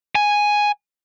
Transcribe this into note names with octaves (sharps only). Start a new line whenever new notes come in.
G#5